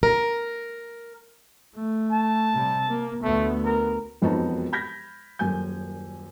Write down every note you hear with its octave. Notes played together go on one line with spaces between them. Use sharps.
A#4
A3
A5
C3 G3
A#3
D2 A3 B3
A#4
E1 F2 B3 D#4 F#4 A5
B5 F6 G6 G#6 A#6 B6
D#1 F#2 A#3 G#5 G6